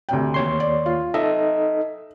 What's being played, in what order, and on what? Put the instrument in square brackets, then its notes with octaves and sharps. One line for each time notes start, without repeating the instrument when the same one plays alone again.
[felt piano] D2 C3 G5
[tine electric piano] D#2 C#5 C6
[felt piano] D5
F4
[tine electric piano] D#4 A4 D#5 [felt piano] E5